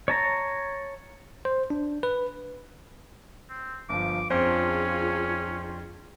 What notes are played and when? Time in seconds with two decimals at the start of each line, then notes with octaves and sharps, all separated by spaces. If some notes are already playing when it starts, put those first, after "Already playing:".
0.08 C#5 A5 A#5
1.45 C5
1.70 D4
2.03 B4
3.50 C4
3.89 G1 F3 D6
4.30 F2 C#4 D4 F4 G#4 C5